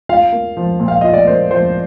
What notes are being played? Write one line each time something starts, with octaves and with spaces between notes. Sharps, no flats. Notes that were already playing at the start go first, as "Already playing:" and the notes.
F4 F5
A#3
F3
A#2
F5
F4 D#5
D5
A#3 C5
F3 C5